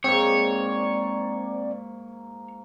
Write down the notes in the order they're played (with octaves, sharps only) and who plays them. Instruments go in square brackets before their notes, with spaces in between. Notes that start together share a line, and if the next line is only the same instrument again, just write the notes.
[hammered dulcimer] G#2 A#3 [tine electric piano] C4 [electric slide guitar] C#5 [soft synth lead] D5